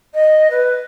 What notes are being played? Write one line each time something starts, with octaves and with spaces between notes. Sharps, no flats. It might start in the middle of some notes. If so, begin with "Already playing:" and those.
D#5
B4